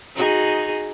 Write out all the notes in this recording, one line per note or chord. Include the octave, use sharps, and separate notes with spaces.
D#4 F#4 G#4